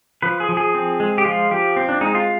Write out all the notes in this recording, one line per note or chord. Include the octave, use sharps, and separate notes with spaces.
F3 B4
G#4
F3
G#4
C4
G#3
G4
F3 F4
F3 G4
C4
D4
G#3 D#4
F4